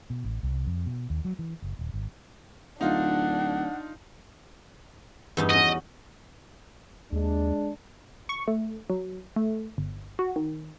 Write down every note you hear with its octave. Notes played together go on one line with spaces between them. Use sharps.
B2
A1
C2
F2
B2
D#2
F#3
E3
F#1
D#1
G#1
D1 D4 D#4 F4 F#5
E2 G2 D#4
C#4 F#4 D#5
D#2 G#3 D4
C#6
A3
F#3
A3
G1
F#4
D#3